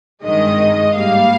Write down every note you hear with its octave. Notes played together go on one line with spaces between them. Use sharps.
G#1 G2 D#3 G#3 D#5
G#2 G3 A#3 F5